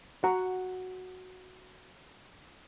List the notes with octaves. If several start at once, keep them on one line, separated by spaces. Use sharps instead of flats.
F#4 F#5 A#5